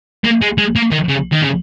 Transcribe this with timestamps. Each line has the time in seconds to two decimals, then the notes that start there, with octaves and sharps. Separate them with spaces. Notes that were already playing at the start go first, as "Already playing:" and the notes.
0.25 A#3
0.42 G#3
0.58 G#3
0.76 A#3
0.92 D#3
1.09 C#3
1.32 D#3
1.42 C#3